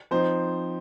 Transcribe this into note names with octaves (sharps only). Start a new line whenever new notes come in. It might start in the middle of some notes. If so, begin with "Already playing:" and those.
F3 C4 D#4 C5